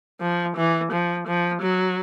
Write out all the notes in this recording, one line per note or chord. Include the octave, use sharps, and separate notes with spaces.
F3
E3
F3
F3
F#3